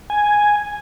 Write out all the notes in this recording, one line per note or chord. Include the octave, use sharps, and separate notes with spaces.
G#5